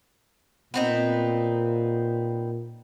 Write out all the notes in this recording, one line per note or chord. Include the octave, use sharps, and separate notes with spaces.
A#2 B3 C4 D#4